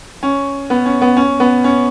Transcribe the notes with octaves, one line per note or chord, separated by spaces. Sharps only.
C#4
B3
C#4
B3
C#4
B3
C#4